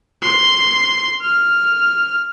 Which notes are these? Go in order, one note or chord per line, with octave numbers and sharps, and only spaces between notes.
C6
F6